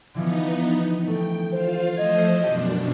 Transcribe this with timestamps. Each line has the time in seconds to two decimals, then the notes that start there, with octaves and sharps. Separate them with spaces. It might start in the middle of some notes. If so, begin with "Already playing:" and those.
0.14 D3 E3 F3 B3 D#4
1.07 A3 G5
1.52 F4 C5 F5
1.97 F3 A3 C5 D#5 G#6
2.43 F#2 B2 D4 G4